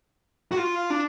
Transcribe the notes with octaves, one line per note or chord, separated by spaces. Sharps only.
F#4
F4
D4